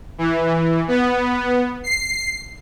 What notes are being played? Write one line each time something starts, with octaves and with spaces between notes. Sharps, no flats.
E3
B3
C7